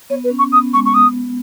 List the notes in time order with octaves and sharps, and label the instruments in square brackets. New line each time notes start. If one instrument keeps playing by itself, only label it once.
[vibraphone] B3 [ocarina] C#5
[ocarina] B4
[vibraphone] C#4
[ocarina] C#6
[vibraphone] B3 [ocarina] D#6
[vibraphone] G#3 [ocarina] C#6
[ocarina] C#6
[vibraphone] B3 [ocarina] D#6